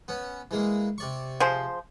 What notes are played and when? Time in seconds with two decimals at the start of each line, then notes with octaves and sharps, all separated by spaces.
0.08 B3 C#4
0.51 E3 G#3 A#3
0.98 C3 D5 C#6
1.40 F3 G#4 C5